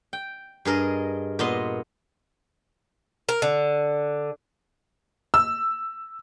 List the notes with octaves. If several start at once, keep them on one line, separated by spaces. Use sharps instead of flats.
G5
G2 G#4 A#4 D#5
A#2 B3 D#5 C6
A#4
D3
E6